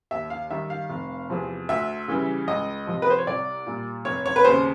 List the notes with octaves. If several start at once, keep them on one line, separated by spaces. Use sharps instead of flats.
D#2 E5
F5
D#3 G3 E5
F5
F1
E2 C3 F3
D2 E5
C#3 E3 G3
C#2 D#5
C3 F3
B4
C5
C#5
C2 D5
A#2 G3
F1 C#5
C#5
B4
D#2 C#3 C5